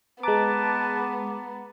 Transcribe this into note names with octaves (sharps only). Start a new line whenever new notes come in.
G#3 B3 B4 A5 A#5 D6